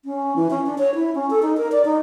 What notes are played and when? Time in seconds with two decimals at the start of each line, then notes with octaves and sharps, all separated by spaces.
0.05 C#4
0.36 E3
0.50 C#4
0.66 D4
0.78 C#5
0.95 E4
1.15 C#4
1.30 A4
1.42 D#4
1.57 A#4
1.72 D5
1.85 D#4